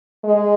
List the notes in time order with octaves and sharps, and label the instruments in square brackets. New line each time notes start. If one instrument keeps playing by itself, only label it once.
[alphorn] G#3